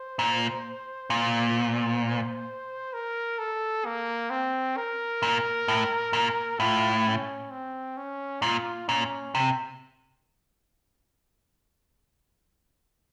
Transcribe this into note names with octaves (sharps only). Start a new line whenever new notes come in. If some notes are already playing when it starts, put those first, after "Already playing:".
Already playing: C5
A#2
A#2
A#4
A4
A#3
C4
A#4
A#2
A2
A#2
A2 F4
C#4
C4
C#4
A#2 F4
A#2 C#4
C3